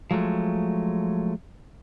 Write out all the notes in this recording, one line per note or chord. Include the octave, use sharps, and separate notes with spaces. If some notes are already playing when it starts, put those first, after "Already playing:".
F3 F#3 G#3 A3